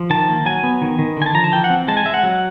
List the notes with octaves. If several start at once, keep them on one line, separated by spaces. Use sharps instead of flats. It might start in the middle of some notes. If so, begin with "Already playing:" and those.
Already playing: F3
D#3 A5
A#3
F#3 G#5
B3
D#3
D#3
D3 G#5
A5
F3 A#5
A5
E3 G5
F#5
C4
G#3 A5
G#5
G#3 E5
F#5
F#3